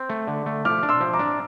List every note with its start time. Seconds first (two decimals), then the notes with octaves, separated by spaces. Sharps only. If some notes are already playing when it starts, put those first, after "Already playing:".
Already playing: C4
0.10 A3
0.28 D3
0.46 A3
0.65 F3 D6 F6
0.83 D4
0.89 C6 E6
1.01 F3
1.13 A#5 D6
1.19 D4